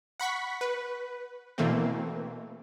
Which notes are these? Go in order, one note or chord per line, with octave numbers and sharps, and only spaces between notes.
F#5 B5 C#6 B6
B4
B2 E3 A3 A#3 C4